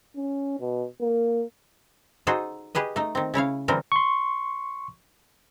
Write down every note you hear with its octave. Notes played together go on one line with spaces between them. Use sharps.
C#4
B2
A#3
D#4 F#4 G#4 A4 C5
G4 G#4 B4 D#5
A3 D#4
D#3 C4
C#3 E4 C#5 F5
D3 E3 G3 C4 A#4
C6 C#6